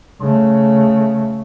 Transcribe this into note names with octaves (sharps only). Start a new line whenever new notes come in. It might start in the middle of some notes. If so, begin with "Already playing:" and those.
C#3 A3